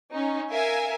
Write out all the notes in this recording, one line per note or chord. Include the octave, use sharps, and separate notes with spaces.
C#4 D#4
A#4 E5 F5 G#5